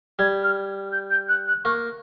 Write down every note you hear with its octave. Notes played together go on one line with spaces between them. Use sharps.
G3 G#6
F6
G6
G6
F#6
F#6
A#3 C#6